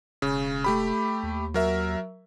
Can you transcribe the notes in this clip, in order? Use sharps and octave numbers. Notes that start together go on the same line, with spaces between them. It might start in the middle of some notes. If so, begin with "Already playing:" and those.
E1 C#3
A3 G4 B5
D#2
F#3 A#4 E5